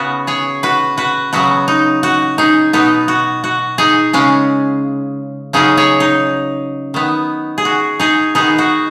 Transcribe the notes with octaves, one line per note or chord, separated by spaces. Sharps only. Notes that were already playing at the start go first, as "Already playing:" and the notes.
Already playing: C#3 B3 F#4
G#4 C#5
F#4 B4
F#4 B4
C#3 F#3 B3 F#4
D#4
F#4
D#4 G#4
B2 B3 D#4
F#4
F#4
D#4 G#4
C#3 G#3 C#4
C#3 F#3 C#4 D#4 G#4
G#4 C#5
D#4
D#3 B3
G#4
F#4
D#4 G#4
D#3 B3 D#4 G#4
F#4